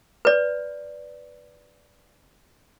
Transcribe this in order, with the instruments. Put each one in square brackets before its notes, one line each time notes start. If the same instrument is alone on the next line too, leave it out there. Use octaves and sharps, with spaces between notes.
[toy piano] B4 D5